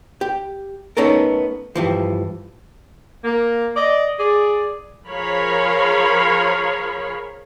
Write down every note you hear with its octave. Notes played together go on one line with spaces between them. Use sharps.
G4
A3 B3 C#4 D#4 A4 A#4
G2 E3 F3
A#3
D5 D#5
G#4 D5
F3 G#4 A#4 C#5 F5 B5